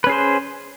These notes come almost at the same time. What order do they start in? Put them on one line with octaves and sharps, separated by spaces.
B4 C#4 G#4 C5